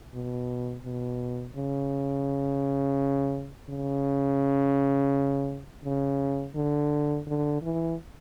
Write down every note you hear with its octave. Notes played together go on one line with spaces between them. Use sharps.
B2
B2
C#3
C#3
C#3
D3
D3
E3